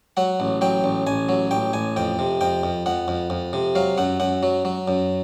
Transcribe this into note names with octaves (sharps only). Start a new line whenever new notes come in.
F#3 F#5
A1
F#3 G5
A1
A1 G#5
F#3
A1 G5
A1 G#5
F2 G5
C3
F2 G5
F2
F2 F#5
F2
F2
C3
F#3 F5
F#2 F#5
F#2 F#5
F#3
F#3
F#2